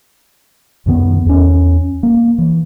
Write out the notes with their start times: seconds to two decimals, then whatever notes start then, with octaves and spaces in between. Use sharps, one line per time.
0.86 C2 F#2 D#3 B3
1.26 E2 C#4
2.03 A#3
2.38 E3